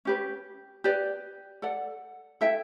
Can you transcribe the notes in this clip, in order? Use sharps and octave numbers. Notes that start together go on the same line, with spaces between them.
C#4 G4 B4
G4 B4 D5
A4 D5 F#5
E4 A4 E5 G5